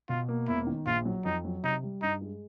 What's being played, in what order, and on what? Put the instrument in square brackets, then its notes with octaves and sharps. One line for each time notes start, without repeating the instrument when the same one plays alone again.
[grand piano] B2 [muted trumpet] F4
[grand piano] A#3
[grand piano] E1 [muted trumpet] E4
[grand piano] D#3
[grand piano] A#1 [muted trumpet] F4
[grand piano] F#3
[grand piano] F2 [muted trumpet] D#4
[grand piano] F#3
[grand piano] C3 [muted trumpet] D#4
[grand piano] G3
[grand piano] G2 [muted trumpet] D#4
[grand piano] G#3